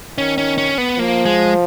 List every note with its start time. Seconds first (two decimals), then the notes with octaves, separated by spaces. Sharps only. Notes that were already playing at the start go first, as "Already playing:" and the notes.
0.17 D#3 C#4
0.38 C#4
0.58 C#4
0.78 B3
0.98 F3 A#3
1.26 G#3